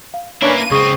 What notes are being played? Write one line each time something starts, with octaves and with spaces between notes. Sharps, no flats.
F5
A#3 C#4 D4 E4 B4 D7
D#7
C#2 C4 G#4 C#6 D#6